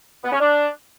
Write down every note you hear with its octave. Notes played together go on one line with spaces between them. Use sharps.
B3
C#4
D4